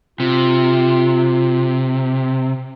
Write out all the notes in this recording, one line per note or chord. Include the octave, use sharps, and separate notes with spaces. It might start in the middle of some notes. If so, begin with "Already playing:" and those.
C3 F4